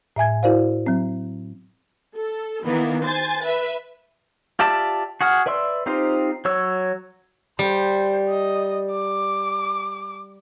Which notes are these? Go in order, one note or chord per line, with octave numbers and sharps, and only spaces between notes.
A2 E5 G#5 G#6
E4 F#4 A#4 C5 D5 F5
F#3 C4
A4
D#3 E3 A#3 B3
C5 G#5 A6
B4 E5
F4 G4 D5 E5 A5
F#4 G#4 F#5 F6
B4 D5 E5 C6 E6
C4 D#4 F4 G4 C5
F#3 C#5 E6
G3 C5
D#5
D6